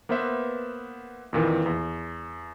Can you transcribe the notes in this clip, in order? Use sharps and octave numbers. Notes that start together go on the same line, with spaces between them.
A#3 B3 B4 C5 E5
F2 A#2 D#3 E3
E2